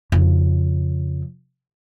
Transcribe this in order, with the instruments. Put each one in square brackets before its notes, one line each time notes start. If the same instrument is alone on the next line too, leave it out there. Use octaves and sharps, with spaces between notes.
[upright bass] F2 C#3